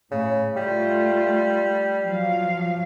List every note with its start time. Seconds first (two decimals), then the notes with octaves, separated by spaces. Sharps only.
0.11 A2 C#3
0.56 G3 A3 F4
2.01 F3 F#3 F5